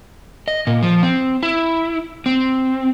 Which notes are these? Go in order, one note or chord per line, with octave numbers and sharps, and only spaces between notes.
D#5
A#2
F3
C4
E4
C4